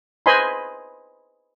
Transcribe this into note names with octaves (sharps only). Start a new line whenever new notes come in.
B4 C5 D#5 G#5 B5 C6